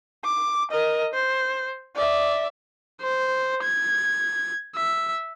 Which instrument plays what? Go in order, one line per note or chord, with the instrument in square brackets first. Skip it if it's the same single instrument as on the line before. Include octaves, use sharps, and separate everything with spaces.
[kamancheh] D6
A#4 D#5
C5
D5 E5
[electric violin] C5
G#6
E5